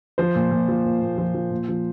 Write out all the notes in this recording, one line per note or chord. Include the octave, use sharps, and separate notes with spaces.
F3 C5
A#2
A#2
F3
A#2
A#2
F3
F3
A#2
F3